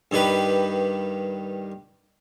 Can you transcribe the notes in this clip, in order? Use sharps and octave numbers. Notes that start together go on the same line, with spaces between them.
G2 D#3 G4 B4